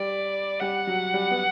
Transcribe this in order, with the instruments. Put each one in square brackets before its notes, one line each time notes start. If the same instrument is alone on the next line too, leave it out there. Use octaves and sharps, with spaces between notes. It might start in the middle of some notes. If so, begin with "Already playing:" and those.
Already playing: [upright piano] G3 [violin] D5
[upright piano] G3 [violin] F#5
[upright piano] F#3
G3
B3